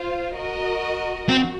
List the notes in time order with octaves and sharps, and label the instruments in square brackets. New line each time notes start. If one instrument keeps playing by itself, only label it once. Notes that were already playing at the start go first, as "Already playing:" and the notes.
Already playing: [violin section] F4 C5 F5
F#4 A#4 D#5
[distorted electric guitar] C4 [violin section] F#4